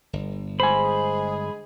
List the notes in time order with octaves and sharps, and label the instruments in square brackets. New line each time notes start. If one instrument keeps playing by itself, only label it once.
[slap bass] G1
[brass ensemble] G#3 G#4 [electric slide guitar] C5 G#5 [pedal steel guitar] B5